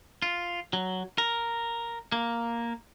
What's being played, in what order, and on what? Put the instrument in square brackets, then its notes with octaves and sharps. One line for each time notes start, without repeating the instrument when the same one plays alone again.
[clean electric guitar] F4
F#3
A#4
A#3